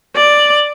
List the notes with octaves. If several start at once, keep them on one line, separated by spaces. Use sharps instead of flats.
D5